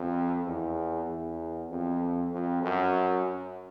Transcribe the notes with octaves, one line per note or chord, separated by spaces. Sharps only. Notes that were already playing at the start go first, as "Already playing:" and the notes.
Already playing: F2
E2
E2
F2
F2
F#2